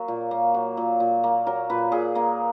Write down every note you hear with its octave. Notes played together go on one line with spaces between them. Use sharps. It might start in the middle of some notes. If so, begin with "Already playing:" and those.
Already playing: F#3 A#3 A#4
A#2
A#3
F#3
A#2
A#2
A#3
F#3 A#4
A#2 B4
A#2 G#4
A#3 A#4